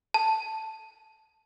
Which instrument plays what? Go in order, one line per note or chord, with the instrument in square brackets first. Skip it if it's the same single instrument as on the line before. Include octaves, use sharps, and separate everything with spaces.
[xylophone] A5